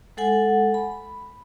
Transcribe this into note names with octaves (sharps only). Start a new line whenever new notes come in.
G#3 A4 F#5 G#5
B5